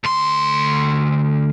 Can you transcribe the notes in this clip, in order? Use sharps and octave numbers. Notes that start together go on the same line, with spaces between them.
D2 C6